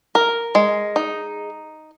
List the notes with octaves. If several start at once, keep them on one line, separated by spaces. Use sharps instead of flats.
A#4
G#3
D#4